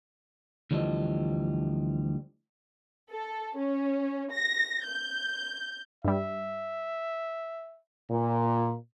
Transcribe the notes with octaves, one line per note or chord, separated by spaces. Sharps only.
D2 E3 F3 G3 A4 D#5
A4
C#4
A#6
G6
G2 G3 E5
A#2